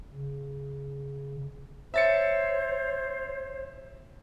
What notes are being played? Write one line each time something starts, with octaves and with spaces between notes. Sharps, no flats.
C#3
C5 C#5 E5 A6 C#7